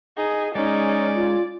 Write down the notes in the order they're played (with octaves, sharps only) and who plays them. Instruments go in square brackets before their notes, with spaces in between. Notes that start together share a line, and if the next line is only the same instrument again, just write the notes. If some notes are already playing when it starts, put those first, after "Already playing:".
[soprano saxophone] D#4 [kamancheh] G#4
[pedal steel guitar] G#3 [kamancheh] C#4 D#4 [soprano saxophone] D5
[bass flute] F4